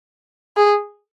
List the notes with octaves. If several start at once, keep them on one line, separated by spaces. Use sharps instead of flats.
G#4